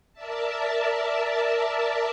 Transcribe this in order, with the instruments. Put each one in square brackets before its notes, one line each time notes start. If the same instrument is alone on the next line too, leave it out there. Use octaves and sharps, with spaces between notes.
[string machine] A#4 D5 E5 A5